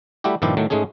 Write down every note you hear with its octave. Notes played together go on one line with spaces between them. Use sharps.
G3 A3 E4 F#4 G4
G2 A#2 D#3 F3 E4 G4
A2 D#3 F#3 A3
G#2 G#3 A3 C#4 G#4